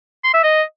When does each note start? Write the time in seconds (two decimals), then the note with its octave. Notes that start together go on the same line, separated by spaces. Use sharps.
0.24 C6
0.34 E5
0.44 D#5